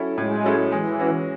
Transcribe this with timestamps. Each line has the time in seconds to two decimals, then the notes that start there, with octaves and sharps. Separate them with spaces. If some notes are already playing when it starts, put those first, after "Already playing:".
Already playing: F#3 C#4 E4 A4
0.17 A2 G#3
0.44 F#3 C#4 E4 A4
0.72 E3 G#3
0.99 C#4 F#4